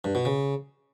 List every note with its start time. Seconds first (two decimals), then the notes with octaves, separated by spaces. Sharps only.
0.04 G2
0.15 B2
0.25 C#3